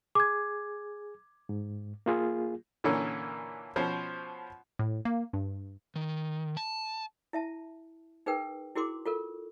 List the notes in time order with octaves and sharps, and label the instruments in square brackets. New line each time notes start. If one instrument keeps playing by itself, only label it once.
[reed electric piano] G#4 [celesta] D6 G#6
[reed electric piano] G#2
A#3 F4 G#4
[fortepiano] A#2 D3 E3 A#3 C#4
B2 F3 C#4 C5
[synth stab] A2
A#3
G2
[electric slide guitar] D#3
A5
[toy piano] E4 E5 A5
D#4 G#4 A#4 B4 G5
E4 F#4 G#4 A#4 C6 D6
F4 A4 A#4